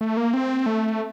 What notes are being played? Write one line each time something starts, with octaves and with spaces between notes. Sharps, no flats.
A3
A#3
C4
A3